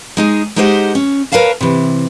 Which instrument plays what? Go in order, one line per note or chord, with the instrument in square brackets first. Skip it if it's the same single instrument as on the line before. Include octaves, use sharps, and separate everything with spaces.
[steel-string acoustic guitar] G#3 D#4 G#4
G#3 D#4 E4 G4 C5 F#5
C#4
A#4 B4 C#5 F5 A5
C3 E3